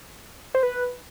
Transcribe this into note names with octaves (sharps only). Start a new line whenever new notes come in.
C5
B4